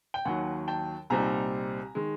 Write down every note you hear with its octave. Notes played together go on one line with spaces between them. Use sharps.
G5
D#2 D#3 F#3 F#5 G#5
G5 A5
C2 A#2 G3 C4 D#4 G#5 A#5
D#3 G#3